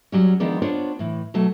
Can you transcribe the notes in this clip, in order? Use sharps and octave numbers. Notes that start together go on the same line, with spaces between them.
F#3 G3 C#4
D#3 F3 G#3 B3 D4
B3 D4 F4 C5 C#5
A2 E3
B2 F#3 A3